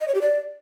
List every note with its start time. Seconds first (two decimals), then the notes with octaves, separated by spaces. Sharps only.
0.01 D#5
0.08 C#5
0.15 G4
0.21 D5